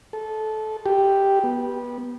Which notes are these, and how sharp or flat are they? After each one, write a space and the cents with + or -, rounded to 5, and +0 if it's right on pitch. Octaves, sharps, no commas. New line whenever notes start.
A4 -20
G4 +0
B3 -20